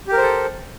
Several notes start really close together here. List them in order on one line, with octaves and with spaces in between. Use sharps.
G4 A#4 C5 A4